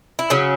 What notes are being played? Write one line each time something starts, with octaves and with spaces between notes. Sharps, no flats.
E4
C#3 F#3 C#4